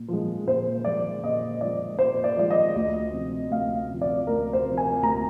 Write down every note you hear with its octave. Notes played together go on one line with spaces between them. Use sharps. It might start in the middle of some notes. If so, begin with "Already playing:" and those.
Already playing: A#2
F3 G#3
A#2 C5
F3 G#3 D5
A#2 D#5
F3 G#3 D5
A#2 C5
D5
F3 G#3 D5
D#5
D2
C3 F3
D2 F5
C3 F3
D5
D2 A#4
C5
C3 F3
G#5
D2 A#5